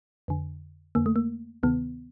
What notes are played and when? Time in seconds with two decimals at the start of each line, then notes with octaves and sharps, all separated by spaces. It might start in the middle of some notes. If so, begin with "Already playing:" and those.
0.28 F2 D3
0.95 F2 D3 A#3
1.06 A3
1.16 A#3
1.63 D2 C3 D#3 B3